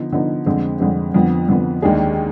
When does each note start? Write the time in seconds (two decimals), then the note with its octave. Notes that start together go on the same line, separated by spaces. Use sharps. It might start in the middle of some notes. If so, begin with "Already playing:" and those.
Already playing: D3 F3 B3 D#4
0.12 D3 F3 B3 D#4
0.46 F2 D3 G#3 C4
0.80 F2 D3 G#3 C4
1.14 F2 D3 F3 B3
1.49 F2 D3 F3 B3
1.82 D#2 D#3 G#3 D4 G#4